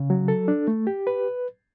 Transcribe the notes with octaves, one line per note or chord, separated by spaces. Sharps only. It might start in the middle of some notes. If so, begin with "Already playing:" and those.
Already playing: C#3
F#3
A4
D4
A3
G4
B4